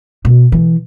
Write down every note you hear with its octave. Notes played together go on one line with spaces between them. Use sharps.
B2
E3